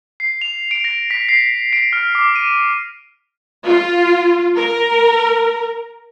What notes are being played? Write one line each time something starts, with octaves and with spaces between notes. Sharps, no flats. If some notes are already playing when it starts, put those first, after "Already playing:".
C7
F7
D7
A#6
B6
C7
D7
F6
D6
D#7
F4
A#4